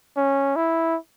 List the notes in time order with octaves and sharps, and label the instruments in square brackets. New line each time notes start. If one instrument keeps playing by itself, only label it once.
[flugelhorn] C#4
E4